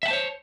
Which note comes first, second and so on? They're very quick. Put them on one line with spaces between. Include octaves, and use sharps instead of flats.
E5 F#5 A5 C5 C#5